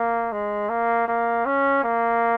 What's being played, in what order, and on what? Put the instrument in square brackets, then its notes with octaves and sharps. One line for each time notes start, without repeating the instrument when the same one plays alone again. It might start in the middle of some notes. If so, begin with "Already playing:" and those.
Already playing: [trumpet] A#3
G#3
A#3
A#3
C#4
A#3